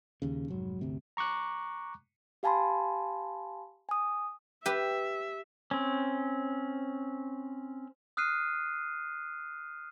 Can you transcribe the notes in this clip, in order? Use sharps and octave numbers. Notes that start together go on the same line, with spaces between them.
D#1 D#2 C#3
F1 G#2 F#3
G1 D2 C3
A#5 C#6 D6 F#6
G4 F5 G#5 A5 B5 C6
G#5 D#6
G4 B4 E5
C4 C#4
D#6 F6 F#6 C7 D#7